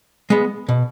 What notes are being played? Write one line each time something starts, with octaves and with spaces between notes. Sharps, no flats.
G#3 B3
B2